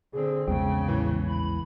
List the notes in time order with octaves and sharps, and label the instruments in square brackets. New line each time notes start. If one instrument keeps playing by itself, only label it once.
[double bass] D3 C4 [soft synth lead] G#4
[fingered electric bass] A#1 E2 G#3 [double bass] C#3 [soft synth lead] G5
[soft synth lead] A2 [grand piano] E3
[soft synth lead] B5